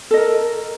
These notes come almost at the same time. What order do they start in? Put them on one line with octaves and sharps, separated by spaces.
A4 D#5 A#4